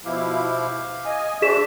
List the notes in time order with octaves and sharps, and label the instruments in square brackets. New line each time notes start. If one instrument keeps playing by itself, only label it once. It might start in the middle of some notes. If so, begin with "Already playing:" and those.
[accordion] B2 F3 E4 [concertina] G4 F5
[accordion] D#5 G#5
[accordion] D4 D5 [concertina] F#4 C5 E5 [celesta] G#4 B6 E7